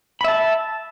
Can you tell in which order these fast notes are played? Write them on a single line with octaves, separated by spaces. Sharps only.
B5 E5 A5